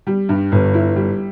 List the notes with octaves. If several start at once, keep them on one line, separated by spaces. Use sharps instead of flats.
G3
G2
G1
E4
G3